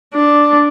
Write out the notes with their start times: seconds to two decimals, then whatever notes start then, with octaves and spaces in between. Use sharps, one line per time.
0.14 D4